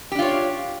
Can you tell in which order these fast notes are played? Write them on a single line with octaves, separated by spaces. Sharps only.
G4 D4 F4 C#5